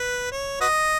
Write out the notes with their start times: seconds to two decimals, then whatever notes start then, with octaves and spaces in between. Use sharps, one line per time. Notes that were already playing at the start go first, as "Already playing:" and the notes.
Already playing: B4
0.32 C#5
0.61 F#4 B4 D#5